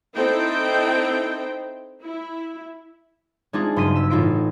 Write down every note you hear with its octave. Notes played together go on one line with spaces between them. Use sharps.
C4 D#4 E4 A4 C5 G5
E4
G#3 C4 D4 D#4 F4 G#4
F#1 G2 C6 D#6 B6 D#7
E6 B6
A1 D#4 F4 B6 D7